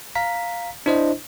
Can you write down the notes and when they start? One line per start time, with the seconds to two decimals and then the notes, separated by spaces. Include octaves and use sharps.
0.15 F5 A#5 B6
0.86 D4 E4 C5 D#5